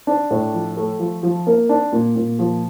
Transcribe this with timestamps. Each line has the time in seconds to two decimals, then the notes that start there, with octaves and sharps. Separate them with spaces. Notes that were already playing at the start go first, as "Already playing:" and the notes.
0.07 D4
0.30 A2
0.54 F3
0.77 A3
0.99 F3
1.23 F3
1.47 A#3
1.69 D4
1.92 A#2
2.16 A#2
2.39 F3